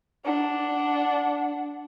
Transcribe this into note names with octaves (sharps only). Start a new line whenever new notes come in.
D4 F#5